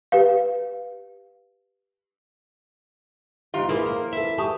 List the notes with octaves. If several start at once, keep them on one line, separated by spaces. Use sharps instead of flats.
G4 B4 F5
F2 G#2 F4 G4 E5
F3 A#3 E4 G#4 B4
A#4
E4 A4 B4 E5
G4 G#4 A5 C#6 D#6